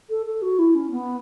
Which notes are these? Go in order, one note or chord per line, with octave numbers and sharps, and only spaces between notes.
A4
A4
F#4
E4
C#4
B3